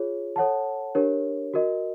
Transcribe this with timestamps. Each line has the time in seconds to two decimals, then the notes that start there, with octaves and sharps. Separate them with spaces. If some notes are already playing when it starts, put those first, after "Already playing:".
Already playing: F4 G#4 C#5
0.36 A4 C#5 F#5 A5
0.95 D4 G4 A#4 C#5
1.54 F#4 A#4 D#5